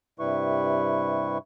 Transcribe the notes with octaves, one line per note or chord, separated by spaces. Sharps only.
G2 C3 G3 E4 B4 C#6